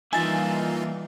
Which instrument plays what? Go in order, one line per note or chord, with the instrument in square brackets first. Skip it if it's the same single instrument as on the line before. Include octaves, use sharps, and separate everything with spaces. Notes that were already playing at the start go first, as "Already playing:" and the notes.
[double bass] E3 G3 [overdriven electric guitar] A#3 E5 [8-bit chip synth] D#4 F4 [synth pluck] G#5 A6